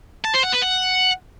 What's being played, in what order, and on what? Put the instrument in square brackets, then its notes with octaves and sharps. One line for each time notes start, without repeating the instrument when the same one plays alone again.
[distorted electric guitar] A5
C5
F#5
B4
F#5